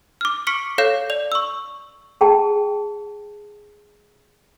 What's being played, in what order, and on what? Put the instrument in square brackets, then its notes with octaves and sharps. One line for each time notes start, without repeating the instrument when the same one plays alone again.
[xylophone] D6 F6
C#6 F6 B6 C#7 D7 G7
A4 C#5 F5 G6 C7 E7
D5 F7
C#6 E6
[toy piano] G#4 G5 A5